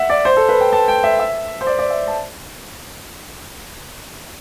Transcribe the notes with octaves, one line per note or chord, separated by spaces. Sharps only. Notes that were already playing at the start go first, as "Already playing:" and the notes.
Already playing: E5 F#5
D5
C5
A4
B4
G5
A5
G5
E5
E5
C5
D5
D5
E5
A5